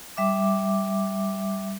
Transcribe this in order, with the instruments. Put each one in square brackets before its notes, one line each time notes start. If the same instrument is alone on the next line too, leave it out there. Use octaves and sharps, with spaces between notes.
[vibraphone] G3 E5 D6